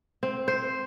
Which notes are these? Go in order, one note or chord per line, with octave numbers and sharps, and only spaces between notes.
C4
C5